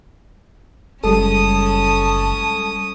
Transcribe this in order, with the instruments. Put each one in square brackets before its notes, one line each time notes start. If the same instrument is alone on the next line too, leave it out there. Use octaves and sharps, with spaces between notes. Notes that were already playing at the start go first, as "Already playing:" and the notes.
[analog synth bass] F#1 [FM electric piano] G3 G#3 A4 [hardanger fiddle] C#4 D#6 [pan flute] A5